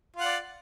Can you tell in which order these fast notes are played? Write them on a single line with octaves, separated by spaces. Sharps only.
F4 F#5 D5